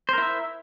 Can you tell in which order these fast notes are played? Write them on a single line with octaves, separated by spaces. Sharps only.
C5 A#4 E4 E5